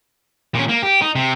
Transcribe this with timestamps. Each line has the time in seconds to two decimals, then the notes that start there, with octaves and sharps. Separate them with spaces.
0.55 A#2 C#4
0.69 A#3
0.83 G4
1.02 D#4
1.15 C3